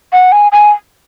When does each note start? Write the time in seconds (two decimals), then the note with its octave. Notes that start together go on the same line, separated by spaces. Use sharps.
0.13 F#5
0.32 G#5
0.52 G#5